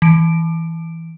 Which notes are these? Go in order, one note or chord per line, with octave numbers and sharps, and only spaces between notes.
E3 D7